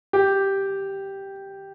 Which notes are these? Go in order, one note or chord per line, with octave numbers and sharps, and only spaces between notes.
G4